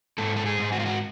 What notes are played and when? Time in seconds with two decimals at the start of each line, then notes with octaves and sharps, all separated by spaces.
0.18 G#2 A4
0.37 A4
0.46 G#4
0.59 G#2
0.72 F#4
0.80 F4
0.86 F#4